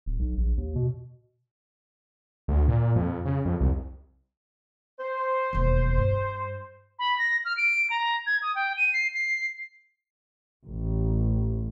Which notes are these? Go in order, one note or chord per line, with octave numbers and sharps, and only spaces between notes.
D1
B1
A#1
D#2
B2
D2
A#2
F2
C#3
F2
C2
C5
E1 D#2
G2
B5
A#6
F6
D7
A#5
G#6
D#6
G5
D#7
C7
C7
A1